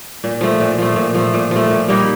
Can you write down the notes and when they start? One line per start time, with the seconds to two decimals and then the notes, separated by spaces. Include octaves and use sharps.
0.24 A#2
0.41 F3 A3
0.60 A#2
0.78 F3 A3
0.96 A#2
1.14 F3 A3
1.34 A#2
1.51 F3 A3
1.70 A#2
1.88 G3 A#3 D#4